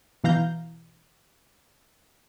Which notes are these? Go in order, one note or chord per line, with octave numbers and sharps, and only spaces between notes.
B2 E3 F5 A#5 G6